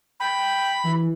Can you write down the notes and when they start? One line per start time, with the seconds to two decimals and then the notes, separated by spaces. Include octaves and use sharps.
0.20 G5 B5
0.84 E3